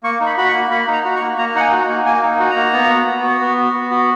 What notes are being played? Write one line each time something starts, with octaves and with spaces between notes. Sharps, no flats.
A#3 C#6
D#4
B5
F#4 B5
C#6
A#3
A#3 B5
D#4
A#5
F#4
C#6
A#3
A#3 A#5
D#4 F#5
G#5
F#4
A#3
A#3 G#5
D#4
F#4
A#5
A#3
B3
F#4
B3
F#4
B3
F#4
B3
F#4